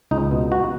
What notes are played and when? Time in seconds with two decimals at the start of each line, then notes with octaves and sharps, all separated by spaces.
0.11 C#2 D#4
0.31 B2
0.52 B2 F#4